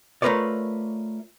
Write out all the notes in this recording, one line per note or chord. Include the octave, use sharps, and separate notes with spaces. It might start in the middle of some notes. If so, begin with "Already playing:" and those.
A3 F4 A#4 B4 C#5 D5